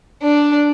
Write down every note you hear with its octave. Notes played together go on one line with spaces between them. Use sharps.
D4